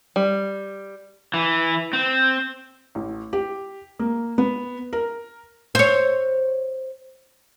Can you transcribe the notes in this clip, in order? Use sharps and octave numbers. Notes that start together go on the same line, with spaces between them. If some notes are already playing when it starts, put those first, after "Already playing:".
G3
E3
C4
A1
G4
A#3
B3
A#4
C5 C#5